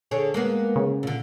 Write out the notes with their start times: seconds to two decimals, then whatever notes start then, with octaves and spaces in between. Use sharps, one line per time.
0.11 D3 G#4 C#5
0.34 G#3 A#3 B3
0.76 C#3
1.03 A#2 D3